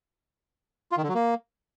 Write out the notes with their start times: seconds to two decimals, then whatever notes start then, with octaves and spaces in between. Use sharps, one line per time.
0.92 F4
0.97 D#3
1.03 D3
1.09 F#3
1.14 A#3